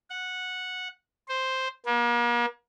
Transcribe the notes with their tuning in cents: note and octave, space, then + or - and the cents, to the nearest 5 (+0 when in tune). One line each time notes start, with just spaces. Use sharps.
F#5 -10
C5 +0
A#3 +40